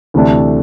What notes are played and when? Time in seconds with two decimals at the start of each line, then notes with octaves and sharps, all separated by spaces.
0.14 D2 C3 E3 A3 D4